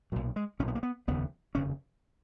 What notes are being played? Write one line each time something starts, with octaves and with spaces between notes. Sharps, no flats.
B1 A#2 F#3
G#3
B1 A#2 C#4
B3
A#3
B3
F1 D#2 C#3 B3
F1 D#2 C#3 C#4